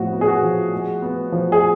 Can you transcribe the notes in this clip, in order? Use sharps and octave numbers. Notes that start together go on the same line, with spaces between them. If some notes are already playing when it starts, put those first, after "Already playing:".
Already playing: A2 F3 B3 F#4
B3
G#4
F#4
F3
G#3
B3
F3
G#4